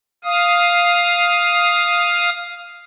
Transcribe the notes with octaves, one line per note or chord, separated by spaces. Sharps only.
F5 D#6